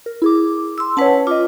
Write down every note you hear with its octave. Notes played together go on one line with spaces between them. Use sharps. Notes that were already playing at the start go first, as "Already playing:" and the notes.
A#4
E4 G#4 D6
C6 E6
C#4 B4 C#5 F#5 A5
F4 D#5 D6